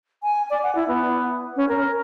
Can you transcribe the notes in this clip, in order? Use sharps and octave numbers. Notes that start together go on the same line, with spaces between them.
G#5
D5
F#5
E4
B3
C#4
A#4